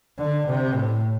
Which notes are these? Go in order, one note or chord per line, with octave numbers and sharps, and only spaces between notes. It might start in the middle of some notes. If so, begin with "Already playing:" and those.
D3
C3
A2